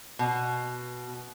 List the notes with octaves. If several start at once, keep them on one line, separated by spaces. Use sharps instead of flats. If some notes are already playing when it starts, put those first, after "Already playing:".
B2